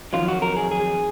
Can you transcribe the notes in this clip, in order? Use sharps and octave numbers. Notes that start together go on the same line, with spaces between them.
F2 D#3 F#3 F4
F#4
A#4
G#4
G#4